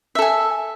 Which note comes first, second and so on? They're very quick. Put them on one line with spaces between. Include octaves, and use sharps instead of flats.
E5 A4 G#5